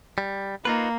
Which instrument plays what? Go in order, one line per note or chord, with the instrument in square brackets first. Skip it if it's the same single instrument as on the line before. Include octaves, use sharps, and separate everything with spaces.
[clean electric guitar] G3
[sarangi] A#3 [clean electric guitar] D#4 F4 B4